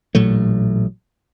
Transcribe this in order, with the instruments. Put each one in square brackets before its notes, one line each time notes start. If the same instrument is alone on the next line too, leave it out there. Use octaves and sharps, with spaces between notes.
[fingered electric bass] A1 A#2 F#3 A3